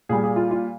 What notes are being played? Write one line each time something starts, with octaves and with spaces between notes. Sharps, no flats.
A#2 G3 G#4
G#4
F4
F4